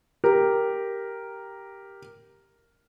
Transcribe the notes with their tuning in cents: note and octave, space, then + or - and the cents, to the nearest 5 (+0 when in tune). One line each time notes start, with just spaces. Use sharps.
G4 +0 A#4 +0